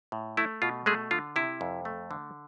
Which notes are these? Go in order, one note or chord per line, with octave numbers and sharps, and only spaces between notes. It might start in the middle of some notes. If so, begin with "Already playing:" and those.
A2
A3 E4
B2 F4
G#3 A3 G#4
D3 F4
C3 E4
F2
A3
D3